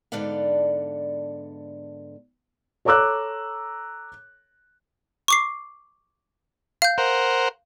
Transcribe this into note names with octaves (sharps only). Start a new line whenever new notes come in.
G#2 D3 B3 A4 D5 F5
A4 C#5 A#5 D6 E6 F#6
C#6 D6 C7
F5 G6
A#4 C5 F#5